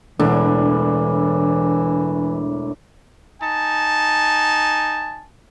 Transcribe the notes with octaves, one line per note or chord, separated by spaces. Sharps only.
E1 A2 D3 E3 D4
D#4 G#5 A5